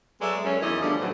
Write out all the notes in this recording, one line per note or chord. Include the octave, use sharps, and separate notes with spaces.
F#3 G#3 B3 A4 D5 E5
F#2 C#4
E2 D#3 E4 D5 D#5
D3 F3 G3 A3
A2 E3 F#3